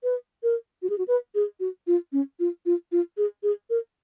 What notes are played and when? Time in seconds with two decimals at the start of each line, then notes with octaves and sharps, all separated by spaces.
0.03 B4
0.43 A#4
0.83 F#4
0.90 G#4
0.98 F#4
1.08 B4
1.35 G#4
1.60 F#4
1.87 F4
2.12 C#4
2.40 F4
2.66 F4
2.92 F4
3.17 G#4
3.43 G#4
3.70 A#4